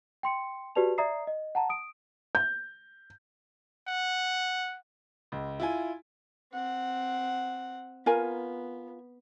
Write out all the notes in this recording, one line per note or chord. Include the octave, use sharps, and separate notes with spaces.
G5 C6 C#7
F#4 G4 B4 D5 A5 F7
D5 E5 A#5 D#6 C7
D#5
F#5 A5 A#5
D#6 D7
G6
F#5
C#2
E4 F4 G#5
C4 F#5
B3 F4 A#4 G#5